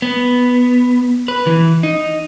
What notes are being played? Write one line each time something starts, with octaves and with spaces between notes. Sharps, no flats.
B3
B4
E3
D#4